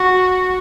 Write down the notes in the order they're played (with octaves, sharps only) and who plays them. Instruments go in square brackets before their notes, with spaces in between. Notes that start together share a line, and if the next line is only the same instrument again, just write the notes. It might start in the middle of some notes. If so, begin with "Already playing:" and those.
Already playing: [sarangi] F#4